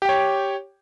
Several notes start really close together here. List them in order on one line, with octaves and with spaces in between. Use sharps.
G4 G5 C#5